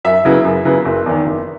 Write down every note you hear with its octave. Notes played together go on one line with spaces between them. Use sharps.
F#2 E5
C#3 F#3 B3 E4
F#2
C#3 F#3 B3 E4
F#1
E2 D#3
F#1